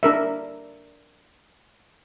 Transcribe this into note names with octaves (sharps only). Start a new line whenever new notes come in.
D4 A#4 E5